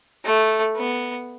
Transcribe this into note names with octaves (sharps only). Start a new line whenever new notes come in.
A3
B3